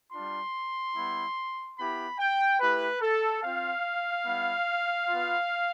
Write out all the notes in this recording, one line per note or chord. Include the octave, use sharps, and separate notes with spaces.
G3 D4 F4 C6
G3 B3 E4
B3 E4 G4 B5
G5
A3 E4 G4 B4
A4
C4 F4 F5
G3 B3 E4
F4
B3